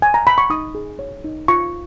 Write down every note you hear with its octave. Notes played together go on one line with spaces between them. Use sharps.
G#5
A#5
B5
C#6
D#4 D#6
G#4
C#5
D#4
F4 C#6